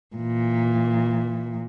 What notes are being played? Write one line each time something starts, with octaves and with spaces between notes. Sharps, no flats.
A#2 E3